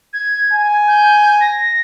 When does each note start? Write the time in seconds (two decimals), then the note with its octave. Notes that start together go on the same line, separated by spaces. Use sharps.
0.13 G#6
0.52 G#5
0.88 G6
1.41 A#6